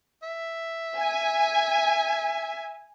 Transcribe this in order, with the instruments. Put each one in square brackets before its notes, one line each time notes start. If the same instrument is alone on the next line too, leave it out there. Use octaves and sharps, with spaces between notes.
[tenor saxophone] E5
[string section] G#5